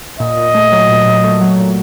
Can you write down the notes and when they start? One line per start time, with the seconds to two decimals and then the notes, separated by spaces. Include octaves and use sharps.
0.19 A#2 D#5
0.37 A#2
0.54 A3
0.72 F#3
0.89 A#2
1.06 A#2
1.24 A3
1.41 F#3
1.58 A#2